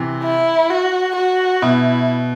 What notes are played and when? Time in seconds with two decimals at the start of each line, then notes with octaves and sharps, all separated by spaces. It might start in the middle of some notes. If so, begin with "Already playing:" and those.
Already playing: C3 E3
0.24 E4
0.70 F#4
1.16 F#4
1.62 B2 E4